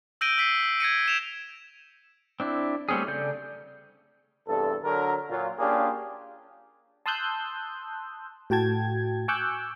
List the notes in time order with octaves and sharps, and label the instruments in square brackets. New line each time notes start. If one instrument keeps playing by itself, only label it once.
[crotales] E6 G6 A#6 D7 D#7 G7
E6 B6 C7
E6
G#6 A#6 C#7 D#7
D7 E7 F7
[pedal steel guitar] C4 D4 E4
G3 A3 C4 C#4 G#4
C#3 A4 D5 G6
[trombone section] E2 G2 C3 A4
D3 F#3 A#4
A#2 F#3 F4
A#3 C#4 D4 F4 G4 G#4
[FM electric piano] A5 C6 D#6 E6 F#6 G6
A2 F#4 G5 A5 G#6
G#5 C#6 D6 E6 F#6 G6